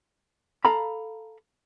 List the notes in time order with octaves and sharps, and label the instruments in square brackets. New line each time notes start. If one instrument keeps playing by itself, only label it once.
[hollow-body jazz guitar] A4 F5 A#5 B5